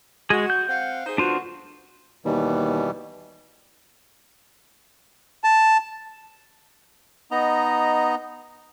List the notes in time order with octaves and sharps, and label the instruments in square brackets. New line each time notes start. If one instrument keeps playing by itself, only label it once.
[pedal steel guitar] G#3 G#4 [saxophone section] F#4
[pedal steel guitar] G6
[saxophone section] C4 F5 F#5
D#4 G#4 C5
[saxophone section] D3 B3 F#4 [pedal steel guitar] D4 F4 C5
[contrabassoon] D#2 [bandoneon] B2 E3 G3
[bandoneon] A5
[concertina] B3 D#4 D#5 A#5